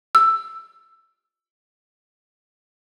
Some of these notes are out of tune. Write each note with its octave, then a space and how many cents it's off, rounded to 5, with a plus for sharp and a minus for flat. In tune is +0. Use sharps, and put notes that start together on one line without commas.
E6 +10